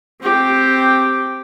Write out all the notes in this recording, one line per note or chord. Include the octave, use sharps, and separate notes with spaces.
C4 G4